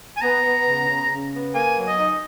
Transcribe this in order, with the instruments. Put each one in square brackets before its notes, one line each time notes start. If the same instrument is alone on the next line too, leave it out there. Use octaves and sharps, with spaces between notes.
[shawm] G#5
[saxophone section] B3 [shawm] A#5
[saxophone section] B3
C#3
C#3
C#3
B3
[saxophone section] A#3 [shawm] G#5
[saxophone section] F#3
[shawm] D#5
[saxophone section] D#4